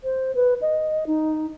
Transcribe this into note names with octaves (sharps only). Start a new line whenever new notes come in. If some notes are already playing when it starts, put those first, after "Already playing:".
C5
B4
D#5
D#4